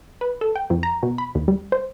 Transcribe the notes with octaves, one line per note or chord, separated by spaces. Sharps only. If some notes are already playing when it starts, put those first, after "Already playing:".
B4
A4
G5
F2
A#5
B2
B5
D#2
G3
C5